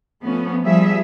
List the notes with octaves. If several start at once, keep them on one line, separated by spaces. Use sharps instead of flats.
F3 A3 B3 C#4
F3 G3 G#4 E5